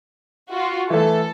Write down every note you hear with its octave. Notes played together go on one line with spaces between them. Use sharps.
F4 F#4
E3 A3 A4